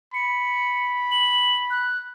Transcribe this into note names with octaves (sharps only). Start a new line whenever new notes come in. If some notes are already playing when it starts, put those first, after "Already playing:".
B5 C#7
F#7
F#6